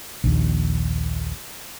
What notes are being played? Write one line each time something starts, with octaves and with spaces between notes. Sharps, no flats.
A#1 D#2